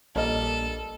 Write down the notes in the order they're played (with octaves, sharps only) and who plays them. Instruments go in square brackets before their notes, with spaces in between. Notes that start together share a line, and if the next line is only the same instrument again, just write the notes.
[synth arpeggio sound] A#1 [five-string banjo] G3 A#3 D#5 [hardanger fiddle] A4